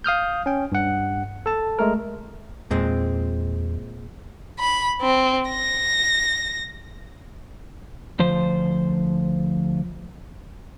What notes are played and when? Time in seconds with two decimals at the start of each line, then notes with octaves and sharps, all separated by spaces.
0.04 F5 D#6 F6 G6
0.46 C#4 G5
0.72 G2 F#5
1.46 A4 A5
1.79 G#3 A3 A#4
2.71 E2 A#2 G#3 C4
4.60 B5
5.01 C4
5.50 A#6
8.19 D2 F3 C5